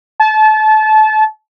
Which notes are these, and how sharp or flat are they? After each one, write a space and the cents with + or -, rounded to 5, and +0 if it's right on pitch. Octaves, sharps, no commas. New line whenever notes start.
A5 -30